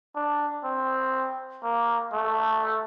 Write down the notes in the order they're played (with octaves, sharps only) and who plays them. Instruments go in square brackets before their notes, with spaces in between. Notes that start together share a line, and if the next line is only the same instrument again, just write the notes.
[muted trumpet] D4
C4
A#3
A3